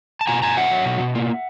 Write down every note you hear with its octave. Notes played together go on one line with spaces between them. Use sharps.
A5
B2 G#5 A#5
B2 G#5 A#5
F#3 E5 F#5
F#3
B2
B2
A#3